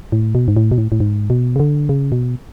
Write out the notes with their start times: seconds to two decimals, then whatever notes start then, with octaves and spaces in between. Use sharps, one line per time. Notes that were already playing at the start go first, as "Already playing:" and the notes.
0.12 A2
0.35 B2
0.48 G#2
0.57 A2
0.72 B2
0.78 A2
0.92 A2
1.00 G#2
1.30 B2
1.56 C#3
1.60 D3
1.89 C#3
2.12 B2